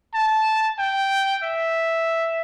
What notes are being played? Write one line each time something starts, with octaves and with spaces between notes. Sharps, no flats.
A5
G5
E5